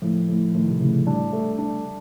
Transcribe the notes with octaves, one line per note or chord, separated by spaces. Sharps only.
A2 F3
A2
A2 D#3
C3
A2 C#3
G3 D4
A3
D4